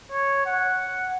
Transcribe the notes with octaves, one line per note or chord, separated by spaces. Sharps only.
C#5
F#5